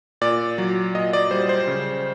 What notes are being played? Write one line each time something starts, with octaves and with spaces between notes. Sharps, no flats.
A#2 D5
F#3
A#2 D#5
D5
G3 C5
C5
C#3